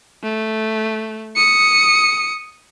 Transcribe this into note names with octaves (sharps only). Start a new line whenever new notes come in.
A3
D#6 C#7